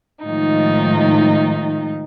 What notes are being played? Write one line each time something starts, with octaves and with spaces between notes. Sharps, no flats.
A2 D#3 F3 G#3 D#4